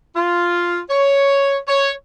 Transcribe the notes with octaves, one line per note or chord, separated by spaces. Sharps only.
F4
C#5
C#5